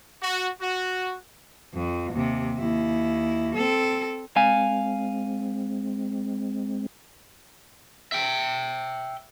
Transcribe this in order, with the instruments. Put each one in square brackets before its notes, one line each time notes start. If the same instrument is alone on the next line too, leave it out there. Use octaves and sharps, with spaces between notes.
[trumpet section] F#4
F#4
[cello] F2
D#2 C3
D#2 E4
C4 A4
[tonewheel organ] G#3 C4 [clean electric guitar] F5 G#5
[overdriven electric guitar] E5 G5